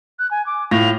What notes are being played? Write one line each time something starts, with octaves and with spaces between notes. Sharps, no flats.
F#6
G#5
D6
A2 F4 A#6 F7